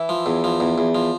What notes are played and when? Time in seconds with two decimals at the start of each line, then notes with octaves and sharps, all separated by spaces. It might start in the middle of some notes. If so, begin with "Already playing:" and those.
Already playing: E3 E4
0.09 F3
0.26 E2
0.44 F3
0.60 E2
0.78 E2
0.95 F3